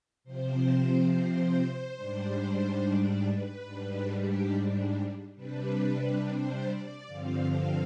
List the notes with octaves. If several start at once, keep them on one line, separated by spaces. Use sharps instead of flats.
C3 F3 C4 C5
C5
G#2 G3 D4
D5
B4
G#2 G3 D4
G4
C3 G3 D4 B4
C5
D5
G2 D3 F3 C4 F5
F5